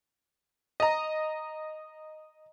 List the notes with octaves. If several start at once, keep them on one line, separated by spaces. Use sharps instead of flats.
D#5 A#5